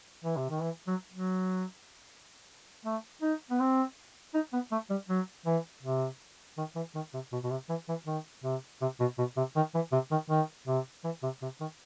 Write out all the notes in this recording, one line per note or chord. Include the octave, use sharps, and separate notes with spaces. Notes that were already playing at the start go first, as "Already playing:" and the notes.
E3
C3
D#3
E3
F#3
F#3
A3
D#4
B3
C4
D#4
B3
A3
G3
F#3
E3
C3
D#3
E3
D#3
C3
B2
B2
C3
E3
E3
D#3
C3
C3
B2
B2
C3
D#3
E3
C3
D#3
D#3
C3
E3
C3
C3
D#3